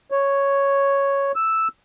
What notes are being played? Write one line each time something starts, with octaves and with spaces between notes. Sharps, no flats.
C#5
E6